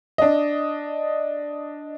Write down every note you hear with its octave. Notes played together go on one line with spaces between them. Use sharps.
D4 D#5